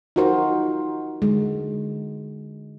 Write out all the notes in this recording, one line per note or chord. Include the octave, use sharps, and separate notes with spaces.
D#4 F4 F#4 A#4 C5
D3 G#3